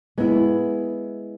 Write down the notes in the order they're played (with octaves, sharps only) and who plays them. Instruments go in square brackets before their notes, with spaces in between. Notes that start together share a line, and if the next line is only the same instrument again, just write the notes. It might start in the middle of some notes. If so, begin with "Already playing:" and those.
[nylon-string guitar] G#3 B3 E4